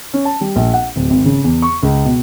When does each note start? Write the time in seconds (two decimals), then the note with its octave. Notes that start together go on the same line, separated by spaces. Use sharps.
0.14 C#4
0.25 A5
0.41 G3
0.56 A#1
0.74 F#5
0.96 D1
1.10 G#1
1.25 C#3
1.44 E2
1.62 C#6
1.83 C#2
2.05 B2